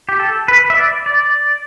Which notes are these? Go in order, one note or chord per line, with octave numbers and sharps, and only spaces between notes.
G4
A4
B4
E5
D5
D5